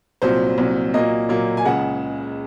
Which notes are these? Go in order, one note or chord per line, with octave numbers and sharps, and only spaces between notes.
C2 A#2 F#3 C5
C2 A#2 F#3
A#2 F#3 A#3 D#5
A#2 F#3 A#3
G#5
C#2 C#3 G#3 F#5